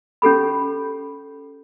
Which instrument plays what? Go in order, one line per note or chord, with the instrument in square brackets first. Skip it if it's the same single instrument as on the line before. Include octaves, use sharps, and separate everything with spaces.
[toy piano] C#4 G4 A4 B5